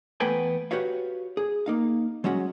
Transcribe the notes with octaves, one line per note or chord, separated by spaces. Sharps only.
E2 A3 B3 B4 G5 G#5
F#4 G4 B4 C#5 F5
G#4
A#3 D#4 F5
F#3 G#3 C#4 F#4